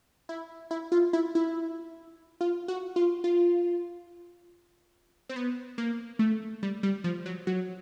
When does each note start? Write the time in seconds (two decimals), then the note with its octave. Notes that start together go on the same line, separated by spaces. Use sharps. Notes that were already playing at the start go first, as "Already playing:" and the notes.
0.29 E4
0.71 E4
0.92 F4
1.13 E4
1.35 E4
2.41 F4
2.68 F#4
2.96 F4
3.24 F4
5.29 C4
5.36 B3
5.78 A#3
6.19 A3
6.63 G3
6.83 G3
7.04 F3
7.26 F#3
7.47 F#3